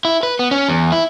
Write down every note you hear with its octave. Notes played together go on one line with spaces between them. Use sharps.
E4
B4
B3
C#4
E2
E4